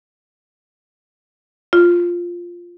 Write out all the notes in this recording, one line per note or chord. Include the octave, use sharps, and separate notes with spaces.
F4